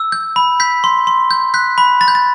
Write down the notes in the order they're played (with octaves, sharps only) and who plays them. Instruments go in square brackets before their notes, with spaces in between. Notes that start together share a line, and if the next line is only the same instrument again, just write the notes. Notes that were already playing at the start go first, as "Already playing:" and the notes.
Already playing: [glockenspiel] E6
G6
B5
G6 B6
C6
C6
G6
F#6 G6 B6
B5
B5 A6
G6
A6